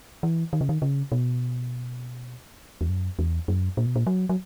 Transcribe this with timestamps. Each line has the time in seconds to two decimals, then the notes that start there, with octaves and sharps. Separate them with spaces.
0.23 E3
0.53 D#3
0.61 C#3
0.69 D#3
0.82 C#3
1.12 B2
2.81 E2
2.89 F#2
3.19 E2
3.48 F#2
3.77 A#2
3.86 B2
3.96 A#2
4.07 F#3
4.29 F#3